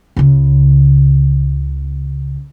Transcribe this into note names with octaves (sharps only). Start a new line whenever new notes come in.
C#2 C#3